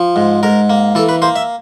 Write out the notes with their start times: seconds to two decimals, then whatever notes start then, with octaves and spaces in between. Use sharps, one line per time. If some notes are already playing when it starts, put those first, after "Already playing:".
Already playing: F3
0.16 G#2
0.43 G#2 A#4
0.70 A#3
0.95 E3 A4
1.09 B4
1.22 A#3 C5
1.36 E5